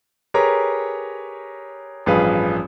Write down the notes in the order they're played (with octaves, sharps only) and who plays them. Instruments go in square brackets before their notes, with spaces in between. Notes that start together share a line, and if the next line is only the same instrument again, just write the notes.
[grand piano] G4 G#4 A#4 B4 C#5 A#5
A1 G2 F3 G#4 B4 F5